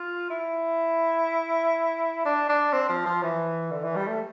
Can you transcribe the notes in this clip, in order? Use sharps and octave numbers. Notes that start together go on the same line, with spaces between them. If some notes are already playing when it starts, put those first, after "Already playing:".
Already playing: F4
E4
D4
D4
C4
F3
F3
E3
D3
E3
G3
A3